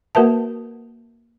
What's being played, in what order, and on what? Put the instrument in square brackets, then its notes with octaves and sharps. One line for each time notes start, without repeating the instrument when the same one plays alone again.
[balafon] A#3 F#4 A#4 B4 E5 A5